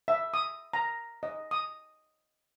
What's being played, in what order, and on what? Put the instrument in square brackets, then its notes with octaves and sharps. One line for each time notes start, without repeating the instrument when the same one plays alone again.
[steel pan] E5
D#6
A#5
D#5
D#6